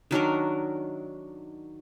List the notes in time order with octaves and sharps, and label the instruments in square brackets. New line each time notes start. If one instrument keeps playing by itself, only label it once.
[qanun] D#3 F#3 D4 A#4